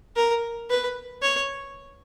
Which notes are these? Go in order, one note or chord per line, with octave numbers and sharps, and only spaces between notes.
A#4
B4
C#5